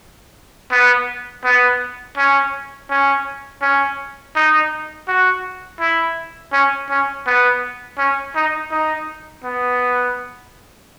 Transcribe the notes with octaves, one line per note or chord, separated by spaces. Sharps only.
B3
B3
C#4
C#4
C#4
D#4
F#4
E4
C#4
C#4
B3
C#4
D#4
D#4
B3